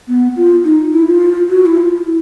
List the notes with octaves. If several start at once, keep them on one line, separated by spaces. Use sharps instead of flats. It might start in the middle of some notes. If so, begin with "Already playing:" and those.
B3
F4
D#4
E4
F4
F#4
E4
F4
E4